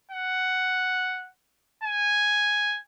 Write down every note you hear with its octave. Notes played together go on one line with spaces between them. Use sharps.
F#5
G#5